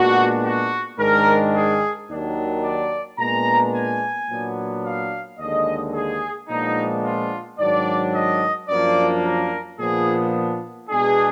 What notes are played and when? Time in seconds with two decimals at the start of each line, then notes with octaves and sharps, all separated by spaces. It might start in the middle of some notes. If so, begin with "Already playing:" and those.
Already playing: A#2 G#3 B3 D4 F#4
0.44 F#4
0.99 G#2 D#3 G#3 D4 A#4
1.54 G#4
2.09 D#2 D#3 F#3 D4
2.64 D5
3.19 A#2 G#3 B3 D4 A#5
3.74 G#5
4.29 A#2 F#3 B3 D4
4.84 F5
5.39 D#2 D3 G#3 D#5
5.94 G#4
6.49 A#2 F3 G#3 B3 D4 D#4
7.04 F4
7.59 G#2 D#3 F#3 D4 D5
8.14 D#5
8.69 F#2 F3 A#3 D4 D5
9.24 A#4
9.79 A#2 F3 B3 D4 G#4
10.89 B2 G#3 B3 D4 G#4